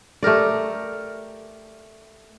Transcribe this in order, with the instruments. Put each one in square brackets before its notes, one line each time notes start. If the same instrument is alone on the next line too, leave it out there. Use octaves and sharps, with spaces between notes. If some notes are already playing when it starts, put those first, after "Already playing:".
[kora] A3 G4 A#4 D5